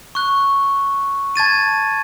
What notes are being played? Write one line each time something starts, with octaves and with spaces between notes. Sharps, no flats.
C#6 F#6
A5 G#6 A6 D#7